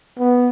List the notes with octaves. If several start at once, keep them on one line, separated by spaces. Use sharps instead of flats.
B3